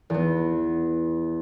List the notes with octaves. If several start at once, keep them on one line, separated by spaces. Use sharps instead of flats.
E2 B3